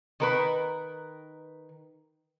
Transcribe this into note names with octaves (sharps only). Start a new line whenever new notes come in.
D#3 A#4 B4